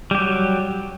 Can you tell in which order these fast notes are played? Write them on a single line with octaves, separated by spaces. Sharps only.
G3 G4 F#3